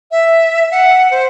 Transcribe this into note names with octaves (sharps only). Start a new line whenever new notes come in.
E5
F#5
C5